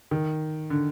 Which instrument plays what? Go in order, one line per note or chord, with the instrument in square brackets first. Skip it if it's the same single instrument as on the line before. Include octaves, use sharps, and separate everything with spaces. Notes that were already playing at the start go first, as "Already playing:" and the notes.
[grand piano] D#3
D3